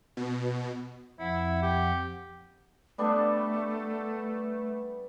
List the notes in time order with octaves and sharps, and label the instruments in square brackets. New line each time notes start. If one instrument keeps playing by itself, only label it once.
[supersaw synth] B2
[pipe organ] F2 F3 F#5 [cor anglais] E4
[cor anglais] G4
[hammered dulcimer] G3 B3 D4 [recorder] A3